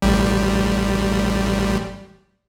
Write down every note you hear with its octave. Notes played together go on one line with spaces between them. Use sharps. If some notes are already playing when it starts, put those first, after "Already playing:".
A1 G3